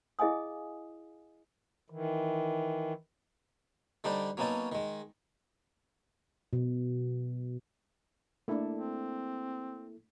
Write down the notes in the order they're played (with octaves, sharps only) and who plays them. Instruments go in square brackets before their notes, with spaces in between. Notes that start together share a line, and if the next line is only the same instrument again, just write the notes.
[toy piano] E4 G#4 D#5 F5 G#5 D#6
[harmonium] D#3 E3
[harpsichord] D3 G3 D4 D#4 C5
F#3 A#3 B3 C#4 D#4 A5
D#3 G#3
[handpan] B2
[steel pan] A3 D4 [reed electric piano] A#3 E4 A4
[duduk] C4